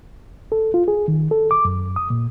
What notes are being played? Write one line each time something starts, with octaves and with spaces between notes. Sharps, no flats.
A4
F4
G#4
D#3
A4
D6
F#2
D#6
A#2